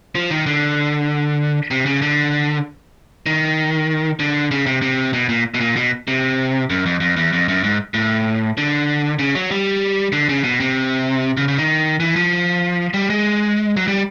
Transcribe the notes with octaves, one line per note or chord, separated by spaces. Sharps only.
F3
D#3
D3
C3
C#3
D3
D#3
D3
C#3
C3
C3
B2
A#2
B2
A#2
B2
C3
F#2
F2
F2
E2
F2
F#2
G#2
A2
D3
C#3
F#3
G3
D3
C#3
B2
C3
C#3
C#3
D#3
E3
F3
G3
G#3
F#3
G3